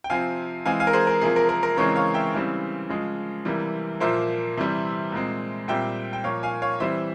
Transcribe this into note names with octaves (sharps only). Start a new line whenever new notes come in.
G5
C3 F3 C4 F5 G#5
E3 G#3 C4 F5 G#5
F5 G#5
A#4
G#4 C5
A#4
C3 F3 A#3 G#4
A#4
A#4
A#4
C#3 E3 G#3 C4 A#4 C#5
C#5 F5
E5 G5
C#3 E3 G3 C4
C#3 F3 G#3
C3 E3 G3 A#3
A#2 F3 A#3 C5 E5
C3 E3 G3
A#2 G#3 C4
A#2 G3 C4 E5 G5
G5
A#2 F3 A#3 C#5 F5
F5 G#5
C#5 F5
E3 G3 C4 C5 E5